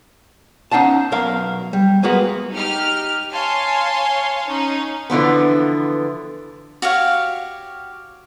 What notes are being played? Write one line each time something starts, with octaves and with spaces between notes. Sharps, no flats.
C#4 D#4 F5 F#5 A5
B1 B2 A#4 F5
G3
G#3 A#3 B3 F#4
D#4 G4 F6
C#5 F5 G#5 A5 C6
C#4 D#4
D3 E3 F3 B3
F#4 G4 C#5 F5